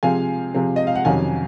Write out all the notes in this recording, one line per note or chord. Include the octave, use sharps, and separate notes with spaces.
C3 F3 G#3 C4 F5 G#5
C3 F3 G#3 C4
D#5
F5
F#5
F2 C3 D#3 F#3 C#4 F5 G#5